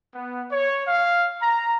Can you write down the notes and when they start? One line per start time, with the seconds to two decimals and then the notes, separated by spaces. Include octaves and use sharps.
0.13 B3
0.50 C#5
0.86 F5
1.42 A#5